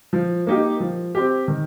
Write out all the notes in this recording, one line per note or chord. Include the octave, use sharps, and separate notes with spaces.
F3
A#3 D#4 G4
F3
C4 G4
D#3